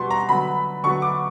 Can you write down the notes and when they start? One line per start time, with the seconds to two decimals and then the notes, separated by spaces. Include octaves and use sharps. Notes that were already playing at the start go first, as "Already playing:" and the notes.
Already playing: B2 G3 B3 C6 C#6
0.10 A#5
0.29 D3 F#3 B3 B5
0.83 D3 F#3 B3 C#6
1.02 D6